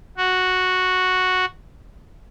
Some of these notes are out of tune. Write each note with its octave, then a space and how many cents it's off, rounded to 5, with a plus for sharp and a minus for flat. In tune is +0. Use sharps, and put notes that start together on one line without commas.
F#4 -5